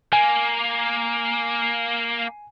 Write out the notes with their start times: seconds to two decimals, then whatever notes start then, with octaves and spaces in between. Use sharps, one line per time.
0.13 A#3 G#5